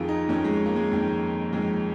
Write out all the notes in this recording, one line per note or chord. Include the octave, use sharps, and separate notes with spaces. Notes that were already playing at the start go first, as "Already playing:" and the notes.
Already playing: F2 D#3 F4 G#4
D#4
F2 D#3 C#4
G#3
A#3
G#3
F2 D#3
F2 D#3 G#3